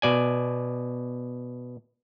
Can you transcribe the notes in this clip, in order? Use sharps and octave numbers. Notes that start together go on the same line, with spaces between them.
B2 D5 G#5